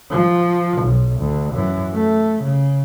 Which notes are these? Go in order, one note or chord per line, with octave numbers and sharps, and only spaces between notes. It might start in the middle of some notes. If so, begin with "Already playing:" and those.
F3
B1
D2
F#2 E3
A3
C#3